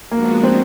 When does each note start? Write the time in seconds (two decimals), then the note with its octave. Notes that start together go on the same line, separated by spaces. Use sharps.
0.11 F3 G#3 A#3 B3 D4 F#4
0.43 C4